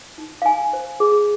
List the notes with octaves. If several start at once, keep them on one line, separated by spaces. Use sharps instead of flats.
D#4
F5
D#4 G#5
C5
G#4